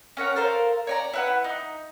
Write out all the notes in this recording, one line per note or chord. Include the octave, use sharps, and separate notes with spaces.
C#4 A#4 C#5 F#5
A4 A#4 C5 F5
C#5 D5 A#5
E4 B4 F#5
D#4